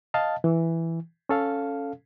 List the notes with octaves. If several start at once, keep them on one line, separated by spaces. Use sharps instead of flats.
D#5 F5 A5
E3
C#4 A4 F5